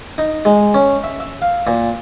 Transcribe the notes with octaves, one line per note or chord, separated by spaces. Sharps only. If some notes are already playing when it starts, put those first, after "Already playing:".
D#4
G#3
C#4
E5
E5
F5
A#2